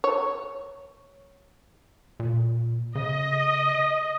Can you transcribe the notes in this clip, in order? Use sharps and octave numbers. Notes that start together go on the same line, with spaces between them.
C#5
A#2
C#3 D#5